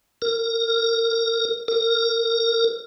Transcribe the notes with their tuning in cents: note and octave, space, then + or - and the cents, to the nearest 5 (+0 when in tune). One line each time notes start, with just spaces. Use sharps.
A#4 -10
A#4 -15